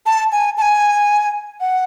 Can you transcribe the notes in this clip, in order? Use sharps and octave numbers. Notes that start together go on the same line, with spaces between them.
A5
G#5
A5
G#5
F#5